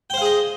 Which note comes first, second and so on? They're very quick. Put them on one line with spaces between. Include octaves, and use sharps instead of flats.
G5 C5 F5 G#4 D#5